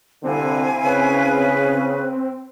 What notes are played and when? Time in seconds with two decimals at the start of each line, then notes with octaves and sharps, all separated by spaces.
0.24 C2 D3 C4 E4 F5 G#5
0.84 C#3 B4